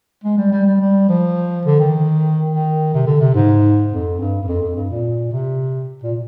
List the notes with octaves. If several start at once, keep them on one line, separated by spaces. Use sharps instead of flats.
G#3
G3
G3
G3
G3
F3
D3
D#3
D#3
C3
D3
C3
G#2
F2
G2
G2
F2
F2
G2
A#2
C3
A#2